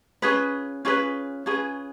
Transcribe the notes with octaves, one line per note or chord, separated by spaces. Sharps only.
C#4 F4 G#4 B4
C#4 F4 G#4 B4
C#4 F4 G#4 B4